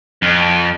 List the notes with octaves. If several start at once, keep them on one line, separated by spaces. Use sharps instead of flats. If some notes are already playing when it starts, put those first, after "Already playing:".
F2